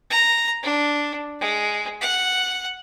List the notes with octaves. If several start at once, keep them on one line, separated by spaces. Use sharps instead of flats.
A#5
D4
G#3
F#5